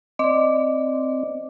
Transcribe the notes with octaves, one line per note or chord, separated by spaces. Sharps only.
C4 D5 D#5 D6